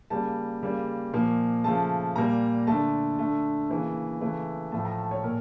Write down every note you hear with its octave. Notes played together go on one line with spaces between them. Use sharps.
C#3 G3 A#3 A5
C#3 G3 A#3
A#2 F3 A#3
C#3 F3 A3 A5
A#2 G3 A#3 A#5
D3 A3 A5
D3 A3
C#3 E3 A#3
C#3 E3 A3
A2 F3 A3 A5
A#5
A5
C#5
A#2 A#4